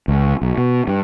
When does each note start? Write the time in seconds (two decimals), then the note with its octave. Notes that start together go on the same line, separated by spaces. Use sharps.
0.08 C#2
0.42 B1
0.58 B2
0.88 G2